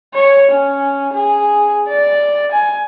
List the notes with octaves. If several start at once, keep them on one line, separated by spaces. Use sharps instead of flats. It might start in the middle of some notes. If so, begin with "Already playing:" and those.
C#5
C#4
G#4
D5
G#5